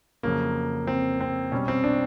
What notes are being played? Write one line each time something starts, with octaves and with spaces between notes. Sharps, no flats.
F2 C#3 F#3 A#3
C4
C4
B2 G3 C#4
C4
D4